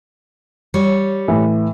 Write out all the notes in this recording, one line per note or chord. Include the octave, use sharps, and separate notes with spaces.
G3 C#5
A2 E3